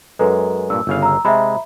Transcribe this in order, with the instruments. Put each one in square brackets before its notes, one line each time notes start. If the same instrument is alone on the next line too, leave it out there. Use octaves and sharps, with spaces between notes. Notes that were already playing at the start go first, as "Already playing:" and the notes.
[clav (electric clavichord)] F#2 G#3 [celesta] A4 B4 A#5
[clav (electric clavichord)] G2 A#2 [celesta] E6
[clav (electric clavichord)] G1 C#3 F5
[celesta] A#5 E6
[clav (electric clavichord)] C3 G#3 [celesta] E5 A#5 B5